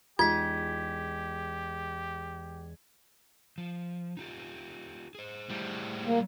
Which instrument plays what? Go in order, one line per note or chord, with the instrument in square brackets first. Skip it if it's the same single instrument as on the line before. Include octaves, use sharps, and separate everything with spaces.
[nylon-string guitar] E2 G#3 D#4 [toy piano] F4 [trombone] G4 [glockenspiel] G#6 B6
[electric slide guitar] F3
D#4 F4 G4
G#4 C5
[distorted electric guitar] A2 G3
[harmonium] A#3